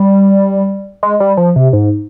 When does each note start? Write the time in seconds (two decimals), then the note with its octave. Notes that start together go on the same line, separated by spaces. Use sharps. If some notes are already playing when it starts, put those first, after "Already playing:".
Already playing: G3
1.03 G#3
1.20 G3
1.37 F3
1.56 C3
1.73 G#2